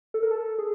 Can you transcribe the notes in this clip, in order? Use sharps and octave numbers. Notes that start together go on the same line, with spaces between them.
A4
A#4
A4
G#4